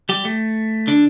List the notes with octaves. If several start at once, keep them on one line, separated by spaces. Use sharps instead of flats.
G3 G4
A3
D3 D4